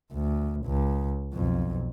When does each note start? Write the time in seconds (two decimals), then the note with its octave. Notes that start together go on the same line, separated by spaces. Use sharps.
0.13 D2
0.65 C#2
1.33 B1 F2